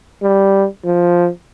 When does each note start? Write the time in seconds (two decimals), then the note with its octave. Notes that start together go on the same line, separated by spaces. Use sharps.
0.22 G3
0.85 F3